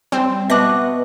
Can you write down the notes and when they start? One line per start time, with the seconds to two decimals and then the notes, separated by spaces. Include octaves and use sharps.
0.12 G3 C4
0.50 B2 B3 E5 A5 D6 F#6 A#6